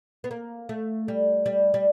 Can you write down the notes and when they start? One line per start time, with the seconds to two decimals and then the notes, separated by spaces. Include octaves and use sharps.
0.24 B3
0.31 A#3
0.69 A3
1.08 G3
1.46 G3
1.74 G3